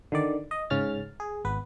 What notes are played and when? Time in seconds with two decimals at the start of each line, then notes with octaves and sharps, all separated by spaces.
0.12 D3 D#3 D5
0.51 D#5
0.70 G#2 C#3 C#4 F6 A6
1.20 G#4
1.45 G#1 B3 B4